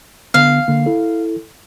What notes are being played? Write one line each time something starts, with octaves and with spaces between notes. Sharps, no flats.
D3 B3 F5
D3 A#3
E4 A4